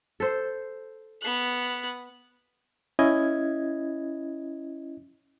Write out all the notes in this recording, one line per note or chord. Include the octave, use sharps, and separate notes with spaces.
A4 C5
B3 F#6
C#4 E4 D#5 G#6